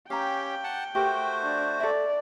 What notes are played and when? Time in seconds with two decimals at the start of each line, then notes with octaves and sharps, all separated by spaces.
0.10 C#4 G4 F5 G5 A#5
0.64 F#5 A5
0.95 A3 F#4 G4 A#4 C5
1.43 D4
1.80 A4 D5 E5